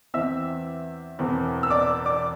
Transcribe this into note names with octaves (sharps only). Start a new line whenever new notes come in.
E2 E3 C4 E5 E6
E1 E2 E3 C4
E6
D5 D6
D5 D6